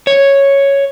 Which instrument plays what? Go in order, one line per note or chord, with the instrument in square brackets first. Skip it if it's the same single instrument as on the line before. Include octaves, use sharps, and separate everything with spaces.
[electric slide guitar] C#5